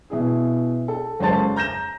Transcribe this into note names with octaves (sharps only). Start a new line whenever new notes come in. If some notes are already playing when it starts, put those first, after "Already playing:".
B2 E4 G#4
A4
F#1 G#3 C#4 C5 A5 A6
A#5 G6 A#6 E7